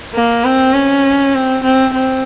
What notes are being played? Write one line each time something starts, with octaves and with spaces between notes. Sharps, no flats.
A#3
C4
C#4
C4
C4
C4